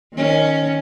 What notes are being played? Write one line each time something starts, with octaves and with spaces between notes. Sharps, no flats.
D#3 C#4